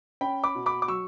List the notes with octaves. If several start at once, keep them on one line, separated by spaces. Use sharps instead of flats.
C#4 G5 B5
B5 D6
B2
B5 D6
D6
F#3 C#6 E6